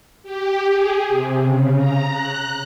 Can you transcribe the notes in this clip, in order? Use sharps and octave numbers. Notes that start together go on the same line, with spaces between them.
G4
G#4
C3
C#3
A#5
F#6